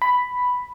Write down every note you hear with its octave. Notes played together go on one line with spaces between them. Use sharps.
B5